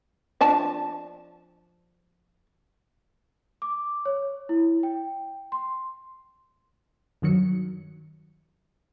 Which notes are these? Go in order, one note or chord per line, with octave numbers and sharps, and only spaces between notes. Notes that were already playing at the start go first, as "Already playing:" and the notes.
F3 D4 A5
D6
C#5
E4
G5
C6
G2 D#3 F#3 C#7